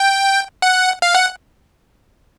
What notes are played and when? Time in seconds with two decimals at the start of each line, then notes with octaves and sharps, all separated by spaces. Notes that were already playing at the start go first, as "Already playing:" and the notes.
Already playing: G5
0.62 F#5
1.02 F5
1.14 F#5